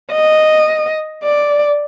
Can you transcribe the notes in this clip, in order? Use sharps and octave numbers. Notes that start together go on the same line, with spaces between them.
D#5
D5